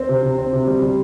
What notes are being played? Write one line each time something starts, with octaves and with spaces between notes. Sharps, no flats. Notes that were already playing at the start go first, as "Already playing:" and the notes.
Already playing: C4 C5
C3
C3
C4
C3
G3
G3